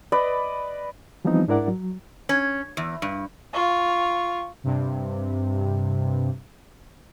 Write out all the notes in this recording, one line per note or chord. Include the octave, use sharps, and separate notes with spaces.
B4 D5 D#5 B5
E3 F3 G3 B3 C4 D#4
G#2 D4 E4 A#4 D5 F#5
F#3
C#4
E2
G2
F4 C#6
G2 C3